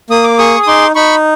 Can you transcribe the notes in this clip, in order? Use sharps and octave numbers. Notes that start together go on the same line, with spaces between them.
A#3 D#6
D6
G#4 C#6 D#6
D#6
D#4 C6 D6
D#4 B5 C#6